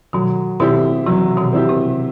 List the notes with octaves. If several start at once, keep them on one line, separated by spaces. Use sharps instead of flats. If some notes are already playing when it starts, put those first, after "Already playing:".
B2 D#3 F#3
B2 D#3 C4 E4 G4
C3 E3 F#3
B2 D#3
C4 E4 G4
C3